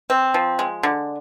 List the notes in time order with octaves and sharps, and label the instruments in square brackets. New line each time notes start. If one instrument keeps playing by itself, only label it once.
[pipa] C4
F3
G#3
D3